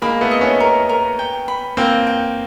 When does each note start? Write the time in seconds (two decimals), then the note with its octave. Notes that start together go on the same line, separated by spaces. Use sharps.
0.02 G#3 A#3 B5
0.21 A3 B3
0.31 D#5
0.41 B3 C#4
0.60 A#4
0.89 A#4
1.19 G5
1.48 B5
1.77 A#3 C4 G5
2.07 G5